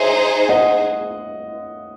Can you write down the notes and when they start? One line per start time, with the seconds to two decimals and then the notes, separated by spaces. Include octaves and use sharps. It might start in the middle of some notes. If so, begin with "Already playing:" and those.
Already playing: D#4 G#4 C5 C#5 E5
0.49 D#5 F#5